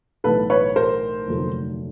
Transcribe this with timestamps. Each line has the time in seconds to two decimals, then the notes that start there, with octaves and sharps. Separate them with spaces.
0.24 B1 A2 E3 A4 B4
0.50 B4 C#5
0.76 A#4 C5
1.28 F1 D#2 D3 F#3 A3